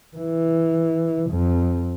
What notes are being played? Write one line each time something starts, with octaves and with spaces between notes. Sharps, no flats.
E3
F2